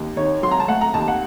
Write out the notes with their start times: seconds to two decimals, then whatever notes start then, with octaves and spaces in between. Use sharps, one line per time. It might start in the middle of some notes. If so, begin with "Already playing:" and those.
Already playing: D#2
0.16 D#3 C#5
0.43 F#3 C6
0.51 A#5
0.60 A5
0.68 A3 F#5
0.81 A#5
0.94 D#2 A5
1.08 F#5